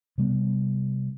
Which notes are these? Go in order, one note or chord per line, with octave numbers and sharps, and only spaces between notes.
C3 G3 B3